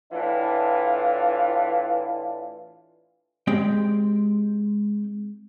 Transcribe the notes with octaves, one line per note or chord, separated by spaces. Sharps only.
A2 E3 D4 F4
G#3 C4 G4 G5